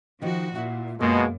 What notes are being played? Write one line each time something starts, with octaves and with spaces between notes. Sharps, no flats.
D#3 F3 D#4 F#4
A#2 E4 F#5
F#2 B2 G#3 A#3 F4